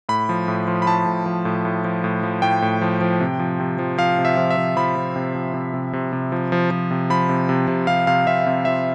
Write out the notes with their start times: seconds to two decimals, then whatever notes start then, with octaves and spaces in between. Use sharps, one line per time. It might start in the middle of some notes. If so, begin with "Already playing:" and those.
0.09 A2 B5
0.29 F3
0.48 A2
0.67 F3
0.82 B5
0.87 A2 A5
1.06 A2
1.26 F3
1.45 A2
1.65 A2
1.85 F3
2.04 A2
2.23 F3
2.42 A2 G5
2.62 A2
2.81 F3
3.01 F3
3.20 C3
3.39 F3
3.60 C3
3.79 F3
3.98 F3 F5
4.18 C3
4.25 E5
4.37 F3
4.50 E5
4.57 F3
4.76 F3 B5
4.96 F3
5.16 C3
5.35 F3
5.54 C3
5.74 C3
5.93 C3
6.13 C3
6.32 F3
6.52 F3
6.71 F3
6.91 C3
7.10 F3 B5
7.29 C3
7.49 C3
7.68 C3
7.87 C3 F5
8.07 C3 F5
8.27 C3 E5
8.46 C3
8.65 F3 E5